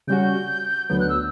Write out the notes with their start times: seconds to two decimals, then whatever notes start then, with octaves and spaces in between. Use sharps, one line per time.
0.07 C#3 G3 C#4 F#4 G6
0.89 D2 D3 F#3 B3 G6
1.00 F#6
1.09 E6